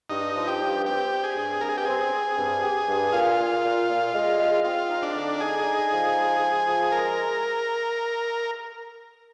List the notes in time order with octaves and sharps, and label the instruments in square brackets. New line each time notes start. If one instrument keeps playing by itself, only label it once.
[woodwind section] G2 [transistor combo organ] D#4
[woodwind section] F3
[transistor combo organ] G4
[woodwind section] G2
[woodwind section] C4 [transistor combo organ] G4
[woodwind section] C4
[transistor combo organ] G#4
[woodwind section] G2
[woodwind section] G2 [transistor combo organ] A#4
[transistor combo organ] G#4
G4
[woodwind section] C4 [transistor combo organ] G#4
[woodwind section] C4
G2
G4
G2
[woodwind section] A#2 [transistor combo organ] F4
[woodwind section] A#2
A#2
A#2
G#3
G#3
[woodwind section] C4 [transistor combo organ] F4
[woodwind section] D#4
[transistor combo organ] D4
[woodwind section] D3
[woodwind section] D#4 [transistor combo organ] G#4
[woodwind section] D#4
F3
G#3
G#3
F3
[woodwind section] G#3 [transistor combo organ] A#4